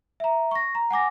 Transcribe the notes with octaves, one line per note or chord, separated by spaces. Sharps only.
E5 A#5
C#6 A#6
A#5
F#5 G#5 D6 A#6